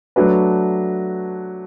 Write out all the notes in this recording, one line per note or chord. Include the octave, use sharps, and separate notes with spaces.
F#3 A3 D4 F#4 B4